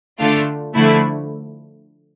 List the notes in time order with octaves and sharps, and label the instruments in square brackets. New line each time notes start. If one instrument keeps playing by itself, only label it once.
[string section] D3 A3 D4 F4
D3 F3 A3 E4